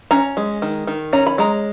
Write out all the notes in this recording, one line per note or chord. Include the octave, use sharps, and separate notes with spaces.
C#4 A#5
G#3
D#3
D#3
C#4 A#5
B5
G#3 A#5